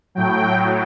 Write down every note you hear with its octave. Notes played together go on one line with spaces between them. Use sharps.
A2 F#3 G5